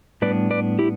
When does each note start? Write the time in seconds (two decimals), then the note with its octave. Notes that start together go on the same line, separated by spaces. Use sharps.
0.22 A2 G3 B3 D4 B4 D5
0.50 B4 D5
0.79 E4 G4